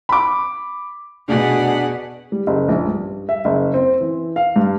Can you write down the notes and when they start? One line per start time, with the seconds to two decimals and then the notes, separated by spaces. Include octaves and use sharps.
0.09 B5 D6
1.28 F1 B2 A3 D4 F#4 G#4 F#5
2.32 G3
2.47 F#1
2.69 A#1
2.87 G2
3.29 E5
3.45 F#1
3.74 C4
4.00 E3
4.36 F5
4.56 G2